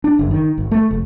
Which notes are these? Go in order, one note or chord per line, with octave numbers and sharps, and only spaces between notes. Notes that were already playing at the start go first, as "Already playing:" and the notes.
D4
F#1
D#3
G#1
A3
F1